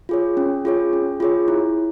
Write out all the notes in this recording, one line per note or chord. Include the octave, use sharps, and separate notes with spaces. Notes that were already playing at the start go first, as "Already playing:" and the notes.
F4 G#4 C#5
C#4
F4 G#4 C#5
C#4
F4 G#4 C#5
E4